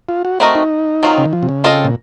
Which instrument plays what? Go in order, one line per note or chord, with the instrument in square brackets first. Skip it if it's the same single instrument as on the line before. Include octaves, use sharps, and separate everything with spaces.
[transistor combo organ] F4
F#4
[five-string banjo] A3 C4 F#4 A#4 D#5
[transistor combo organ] D#4
[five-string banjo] D#3 F#3 C4 F4
[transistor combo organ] C#3
D#3
F3
C3
C#3
[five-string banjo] C4 F4 A4 C5 D#5
[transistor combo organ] A#2